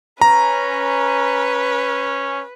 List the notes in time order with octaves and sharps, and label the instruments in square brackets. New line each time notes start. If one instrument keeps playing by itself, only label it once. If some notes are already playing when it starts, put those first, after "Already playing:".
[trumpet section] C#4 [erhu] B4 [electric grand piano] A#5